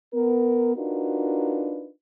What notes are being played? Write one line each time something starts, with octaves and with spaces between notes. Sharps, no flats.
B3 A#4
D4 D#4 F4 F#4 A#4 B4